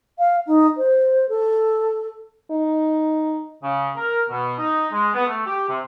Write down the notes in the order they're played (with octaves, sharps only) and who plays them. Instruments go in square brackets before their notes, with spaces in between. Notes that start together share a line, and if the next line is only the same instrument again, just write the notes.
[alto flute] F5
D#4
C5
A4
[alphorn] D#4
[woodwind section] C#3
A#4
B2
D#4
G#3
B3
A3
G4
C3